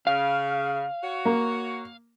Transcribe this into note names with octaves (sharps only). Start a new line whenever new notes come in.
C#3 F5
F#4 C#5
A#3